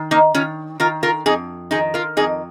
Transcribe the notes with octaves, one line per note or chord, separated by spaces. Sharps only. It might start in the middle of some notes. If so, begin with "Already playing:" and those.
Already playing: D#3
A#3 D#4
D#3 C#4 F4
D#3 F4 A#4
F4 A#4
F2 D#4 G#4
D#3 D#4 G#4
F4 A#4
F2 D#4 G#4